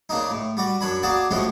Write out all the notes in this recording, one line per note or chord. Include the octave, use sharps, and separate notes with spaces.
C#3 A#3 D4 D#4
A2
G3 F#4 D5
F#2 D4 C#5 B5
A#3 F#4 G#4 D5 G#5 A5
A2 F3 G3 G#3 C#4 F#4